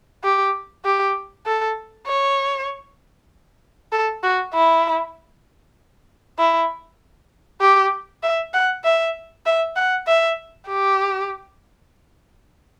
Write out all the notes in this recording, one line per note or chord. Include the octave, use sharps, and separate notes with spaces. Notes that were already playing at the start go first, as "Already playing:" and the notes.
G4
G4
A4
C#5
A4
F#4
E4
E4
G4
E5
F#5
E5
E5
F#5
E5
G4